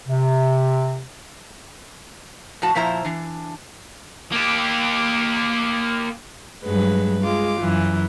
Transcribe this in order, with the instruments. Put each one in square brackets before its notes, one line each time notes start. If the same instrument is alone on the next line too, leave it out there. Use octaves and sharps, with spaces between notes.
[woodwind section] C3
[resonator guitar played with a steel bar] A2 F3 F#4 A5
A#2 F3 E4 C5 E5 A#5
E3 D4
[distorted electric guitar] A#3 G4
[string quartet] G2 F#3 G#3 B4
G#3 F4 D6
F#2 E3